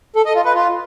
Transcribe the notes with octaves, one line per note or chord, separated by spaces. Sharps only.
A4
D#5
F4
B4
F4